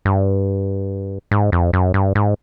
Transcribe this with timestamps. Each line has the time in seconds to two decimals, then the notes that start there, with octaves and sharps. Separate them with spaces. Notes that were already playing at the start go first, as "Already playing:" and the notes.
0.05 G2
1.31 G#2
1.52 F2
1.73 F#2
1.94 G2
2.15 G#2